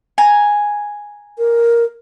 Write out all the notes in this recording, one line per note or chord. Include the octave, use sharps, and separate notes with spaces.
G#5 A#5
A#4